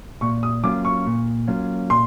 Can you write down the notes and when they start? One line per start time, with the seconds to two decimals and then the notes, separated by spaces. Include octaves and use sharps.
0.21 A#2 C#6
0.43 D#6
0.64 F#3 A#3 C#4 F4 D6
0.85 C#6
1.07 A#2
1.48 F#3 A#3 C#4 F4
1.90 A#2 C6